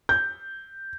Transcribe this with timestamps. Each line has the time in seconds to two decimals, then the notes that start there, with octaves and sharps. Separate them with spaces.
0.09 G6